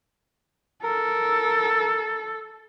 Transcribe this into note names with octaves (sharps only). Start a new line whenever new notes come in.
A4 A#4